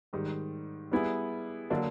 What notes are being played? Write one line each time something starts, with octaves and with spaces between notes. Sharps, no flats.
G#2 D#3 G3
G3 B3 E4 G#4
D3 F#3 A#3 D4